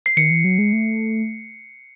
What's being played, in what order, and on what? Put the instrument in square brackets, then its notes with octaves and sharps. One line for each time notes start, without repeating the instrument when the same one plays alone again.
[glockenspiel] C7
[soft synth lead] D#3 [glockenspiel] C#7
[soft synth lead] E3
F#3
G#3
A3